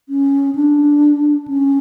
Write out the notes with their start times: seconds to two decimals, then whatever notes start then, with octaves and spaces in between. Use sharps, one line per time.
0.09 C#4
0.55 D4
1.48 C#4